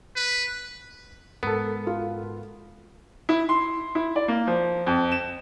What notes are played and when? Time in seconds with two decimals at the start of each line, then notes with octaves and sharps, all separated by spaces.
0.16 B4
1.43 G#2 B3 A4 A#4
1.87 F4
3.29 E4
3.49 C6
3.95 E4
4.16 D5
4.28 A#3
4.47 F3
4.87 F2
5.12 E7